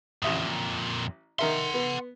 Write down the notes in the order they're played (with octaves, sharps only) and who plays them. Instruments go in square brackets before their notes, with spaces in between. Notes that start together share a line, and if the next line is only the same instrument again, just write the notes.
[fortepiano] A1 E5 D#6 [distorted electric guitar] F2 A#2
[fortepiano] D#3 A#4 E5 [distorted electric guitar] F#5 C6
[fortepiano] B3